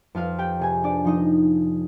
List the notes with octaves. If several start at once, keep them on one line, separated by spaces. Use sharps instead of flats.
F2 F4 F5
G4 G5
C3 G#4 G#5
D4 D5
F3 D#4 D#5